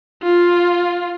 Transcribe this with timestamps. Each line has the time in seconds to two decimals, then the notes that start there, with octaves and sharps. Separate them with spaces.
0.23 F4